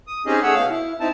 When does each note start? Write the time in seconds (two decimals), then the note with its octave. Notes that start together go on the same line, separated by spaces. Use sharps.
0.07 D#6
0.26 C4 C#4 D#4 G4 G#4 D#5
0.42 A3 G#4 C#5 F#5 E6
0.55 B2 F5
0.70 E4
1.00 C4 D#4 E4 A5